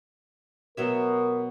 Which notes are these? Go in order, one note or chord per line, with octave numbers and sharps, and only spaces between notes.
B2 F#3 A#4 E5